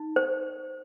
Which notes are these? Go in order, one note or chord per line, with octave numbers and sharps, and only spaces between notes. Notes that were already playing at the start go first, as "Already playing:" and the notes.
Already playing: D#4
C5